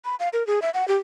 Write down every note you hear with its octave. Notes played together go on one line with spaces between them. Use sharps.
B5
F5
A#4
G#4
E5
F#5
G4